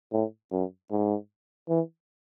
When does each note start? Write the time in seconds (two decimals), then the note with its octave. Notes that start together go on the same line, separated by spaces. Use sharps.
0.12 A2
0.51 F#2
0.91 G#2
1.69 E3